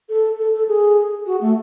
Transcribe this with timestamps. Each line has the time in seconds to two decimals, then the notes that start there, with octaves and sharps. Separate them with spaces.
0.09 A4
0.39 A4
0.53 A4
0.68 G#4
1.26 F#4
1.41 A3